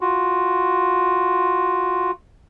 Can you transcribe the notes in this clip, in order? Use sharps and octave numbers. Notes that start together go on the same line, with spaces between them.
F4 F#4